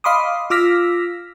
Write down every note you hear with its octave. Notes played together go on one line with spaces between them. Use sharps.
D#5 F5 B5 C6 D6 D#6
F4 D6 E6 F6 A#6 B6